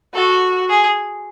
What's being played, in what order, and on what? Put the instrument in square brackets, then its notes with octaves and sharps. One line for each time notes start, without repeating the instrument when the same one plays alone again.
[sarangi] F#4 [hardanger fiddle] A4
[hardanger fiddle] G#4